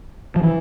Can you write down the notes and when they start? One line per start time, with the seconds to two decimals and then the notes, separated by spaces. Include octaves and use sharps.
0.36 F3
0.43 E3